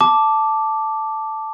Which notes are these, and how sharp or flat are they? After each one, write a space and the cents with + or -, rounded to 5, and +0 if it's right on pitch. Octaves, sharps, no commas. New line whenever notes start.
A5 +0 D6 +0